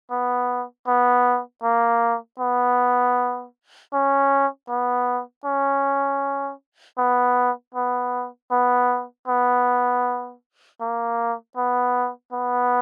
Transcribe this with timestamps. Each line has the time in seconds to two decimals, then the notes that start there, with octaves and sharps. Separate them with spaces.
0.11 B3
0.87 B3
1.63 A#3
2.39 B3
3.93 C#4
4.68 B3
5.45 C#4
6.98 B3
7.75 B3
8.51 B3
9.28 B3
10.81 A#3
11.57 B3
12.32 B3